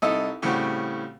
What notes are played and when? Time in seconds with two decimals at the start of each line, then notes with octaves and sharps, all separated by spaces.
0.02 C2 D#4 E4 A4 D#5
0.42 A2 C#3 G3 C4 F#4 G4